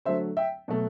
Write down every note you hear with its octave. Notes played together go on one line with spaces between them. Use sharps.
D3 F#3 A3 C5 E5
E5 G5
B2 F#3 A3